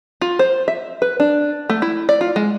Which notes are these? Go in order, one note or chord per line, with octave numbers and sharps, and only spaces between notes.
F4
C5
E5
B4
D4
A3
E4
D5
F4
G#3